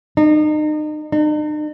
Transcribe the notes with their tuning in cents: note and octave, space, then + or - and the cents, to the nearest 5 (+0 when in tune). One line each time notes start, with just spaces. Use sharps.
D#4 -35
D#4 -45